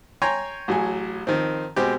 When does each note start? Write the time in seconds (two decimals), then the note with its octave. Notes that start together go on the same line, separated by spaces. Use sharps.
0.22 C#5 G5 G#5 A#5 C6
0.68 A1 F#3 G#4
1.27 D#3 F3 C4
1.76 B2 G#3 C4 G4